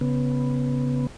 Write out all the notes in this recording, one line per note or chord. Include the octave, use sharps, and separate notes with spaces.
C#3 B3